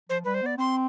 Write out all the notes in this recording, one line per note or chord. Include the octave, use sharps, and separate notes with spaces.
F3 C5
G3 B4
C5
B3 D5
C4 C6